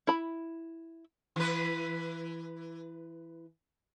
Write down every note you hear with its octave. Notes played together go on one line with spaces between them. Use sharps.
E4 B5
E3 B4